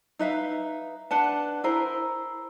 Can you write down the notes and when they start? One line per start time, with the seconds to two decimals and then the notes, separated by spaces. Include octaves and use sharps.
0.19 D#4 B4 E5 F5
1.11 D4 B4 F#5 A5
1.64 E4 G#4 A#4 C5